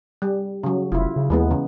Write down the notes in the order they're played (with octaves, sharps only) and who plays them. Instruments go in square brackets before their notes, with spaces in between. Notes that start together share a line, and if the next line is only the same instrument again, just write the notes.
[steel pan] G3
C#3 F#3
[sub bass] F1 [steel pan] E4 F4
[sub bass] C#3
[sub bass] D#2 [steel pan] E3 G#3 B3
[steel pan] C#3